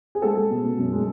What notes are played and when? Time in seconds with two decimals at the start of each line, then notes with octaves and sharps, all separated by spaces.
0.15 G#4
0.22 G#3 A4
0.37 G#3
0.50 B2
0.64 B2
0.78 F#2
0.92 G#3